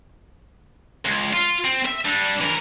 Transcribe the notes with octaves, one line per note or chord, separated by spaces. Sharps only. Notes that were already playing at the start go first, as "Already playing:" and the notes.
C#2
F4
C4
E5
G3 D4
E3 A#4